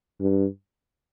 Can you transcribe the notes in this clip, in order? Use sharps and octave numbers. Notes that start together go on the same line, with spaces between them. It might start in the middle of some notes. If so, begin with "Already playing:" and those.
G2